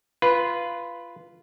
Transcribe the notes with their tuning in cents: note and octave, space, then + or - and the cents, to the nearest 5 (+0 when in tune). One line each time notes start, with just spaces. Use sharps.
F4 -15 B4 +0